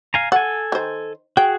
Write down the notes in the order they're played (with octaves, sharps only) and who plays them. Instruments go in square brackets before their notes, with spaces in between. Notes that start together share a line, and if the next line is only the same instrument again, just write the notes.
[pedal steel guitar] F5 G#5 A#5
[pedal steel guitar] A4 G#5 [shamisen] F#5
[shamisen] D#3 C5
[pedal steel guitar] F#4 G#4 [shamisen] G5